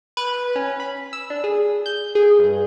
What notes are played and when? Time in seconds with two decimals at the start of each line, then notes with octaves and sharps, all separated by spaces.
0.17 B4
0.56 C#4
0.80 B5
1.13 E6
1.30 D4
1.44 G#4
1.86 G6
2.15 G#4
2.39 G2